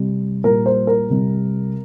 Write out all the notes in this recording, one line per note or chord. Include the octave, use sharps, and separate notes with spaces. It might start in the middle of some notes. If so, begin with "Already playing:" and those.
Already playing: C3 G3
A#2 G3 A#4
C5
A#4
C3 G3